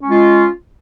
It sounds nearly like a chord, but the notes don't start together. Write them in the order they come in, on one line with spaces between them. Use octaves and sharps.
C#4 G#3 F4